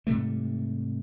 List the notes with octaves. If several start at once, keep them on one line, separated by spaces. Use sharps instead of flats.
G#2 C3 G3 A3